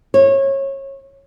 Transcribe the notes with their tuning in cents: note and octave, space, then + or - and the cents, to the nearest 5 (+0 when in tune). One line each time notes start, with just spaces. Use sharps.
C#5 -25